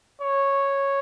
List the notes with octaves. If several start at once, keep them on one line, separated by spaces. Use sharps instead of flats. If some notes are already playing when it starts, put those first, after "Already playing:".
C#5